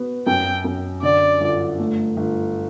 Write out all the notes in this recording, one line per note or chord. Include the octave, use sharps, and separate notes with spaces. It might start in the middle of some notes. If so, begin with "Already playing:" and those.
Already playing: B3 F#4
F#2 G5
F#2
D3 D5
G1
A3
G1